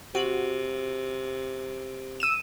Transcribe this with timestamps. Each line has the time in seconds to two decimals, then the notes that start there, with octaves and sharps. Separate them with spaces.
0.15 C3 F#4
2.20 E6 D#7 E7